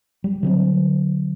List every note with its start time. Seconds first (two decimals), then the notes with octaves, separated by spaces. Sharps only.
0.24 G3
0.43 D3 F#3 C4